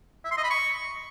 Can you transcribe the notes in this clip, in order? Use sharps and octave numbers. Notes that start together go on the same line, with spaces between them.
E5
C6
D#5
B5
C#6